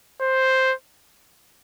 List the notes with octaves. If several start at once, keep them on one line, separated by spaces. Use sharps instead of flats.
C5